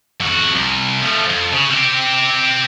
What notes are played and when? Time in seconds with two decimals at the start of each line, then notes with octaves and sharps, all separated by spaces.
0.20 F2 F#4
0.55 C2
1.02 F3 A3
1.29 F2
1.53 C#3
1.71 C4 G4